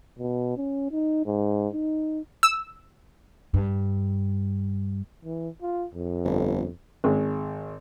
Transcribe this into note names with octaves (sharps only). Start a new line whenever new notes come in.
B2
C#4
D#4
G#2
D#4
E6
G2
E3
F4
F2
G1
G#1 G#3